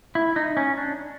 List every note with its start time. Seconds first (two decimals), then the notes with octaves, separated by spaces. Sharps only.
0.15 E4
0.36 D#4
0.57 C#4
0.78 D4